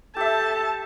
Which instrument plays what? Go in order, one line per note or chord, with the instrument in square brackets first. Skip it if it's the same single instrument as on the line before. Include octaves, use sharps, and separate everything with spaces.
[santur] G4 E5 [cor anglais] A4 [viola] A5